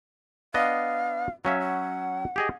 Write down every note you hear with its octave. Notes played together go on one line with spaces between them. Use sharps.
B3 D4 D#5 F5
F#3 C#4 E5 F5
F#5
G4 G#4 D#5